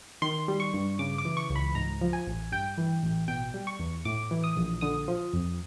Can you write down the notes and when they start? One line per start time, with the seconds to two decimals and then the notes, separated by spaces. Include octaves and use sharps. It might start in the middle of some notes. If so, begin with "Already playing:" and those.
0.22 D#3 C6
0.48 G3
0.60 C#6
0.74 G2
0.99 C#3 D6
1.18 D6
1.25 E3
1.37 C#6
1.50 C#2
1.56 B5
1.75 G#2 A#5
2.01 F3
2.13 G#5
2.27 A1
2.52 G2 G5
2.78 E3
3.03 A1
3.28 B2 G5
3.54 G3
3.67 C#6
3.79 E2
4.05 A2 D6
4.31 E3
4.44 D#6
4.56 A#1
4.81 D3 D#6
5.08 F3
5.33 F2